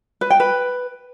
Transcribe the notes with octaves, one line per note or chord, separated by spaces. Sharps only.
B4
G5
B4